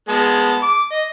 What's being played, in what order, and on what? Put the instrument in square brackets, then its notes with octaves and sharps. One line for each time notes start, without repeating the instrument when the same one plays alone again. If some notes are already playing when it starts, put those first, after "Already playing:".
[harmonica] G#3 B3 A5
D6
D#5